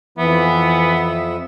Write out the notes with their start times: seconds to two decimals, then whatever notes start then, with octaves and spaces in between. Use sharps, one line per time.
0.18 F2 E3 B3 E5